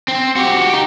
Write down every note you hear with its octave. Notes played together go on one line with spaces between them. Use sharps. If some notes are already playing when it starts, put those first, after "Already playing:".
C4
F#4 G4
D#4 G4